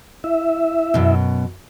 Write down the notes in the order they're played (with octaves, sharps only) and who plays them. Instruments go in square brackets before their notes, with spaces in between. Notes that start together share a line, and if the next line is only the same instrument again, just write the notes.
[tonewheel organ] E4 E5
[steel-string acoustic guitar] F#2 B2